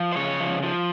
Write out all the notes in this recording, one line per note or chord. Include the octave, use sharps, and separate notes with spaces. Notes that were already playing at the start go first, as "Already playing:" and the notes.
Already playing: F3
C5
C#3 C#5
F3
F3